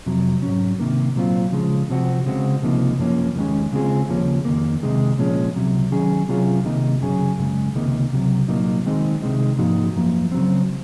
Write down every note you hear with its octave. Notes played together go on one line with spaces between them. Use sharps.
F2 C3 F#3
G#2 F#3 C#4
C3 D#3 A#3
A#2 F#3 C4 F4
C#3 F3 G#3
C3 F3 C4 F#4
C#3 G#3 C4 F#4
C#2 C3 F3 A#3 D#4
F#2 F3 A#3 C#4
D#2 D#3 G#3 C#4
C#3 G#3 C4 F4 G#4
D#2 C#3 F3 A#3 C#4
F2 D#3 A#3
C3 D#3 G#3 D#4
A#2 F3 G#3 C#4
C#2 C3 F#3
D#3 F#3 C#4 G#4
C3 F#3 C#4 F4 G#4
C2 C3 D#3 A#3 D#4
F#2 C#3 F#3 C#4 G#4
F#2 C#3 G#3
C#2 C3 D#3 A#3 D#4
C#2 C3 F#3
C2 A#2 F#3 A#3 D#4
D#3 G#3 C4 D#4
C2 C3 D#3 G#3 D#4
G#2 F3 A#3 D#4 F#4
F#2 F3 A#3
C#3 F#3 C4